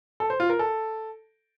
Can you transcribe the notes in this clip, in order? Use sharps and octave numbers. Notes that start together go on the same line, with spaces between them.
A4
C5
F4
A#4
A4